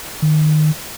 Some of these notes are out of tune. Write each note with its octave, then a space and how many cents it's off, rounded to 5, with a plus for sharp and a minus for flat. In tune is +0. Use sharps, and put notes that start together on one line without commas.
D#3 -20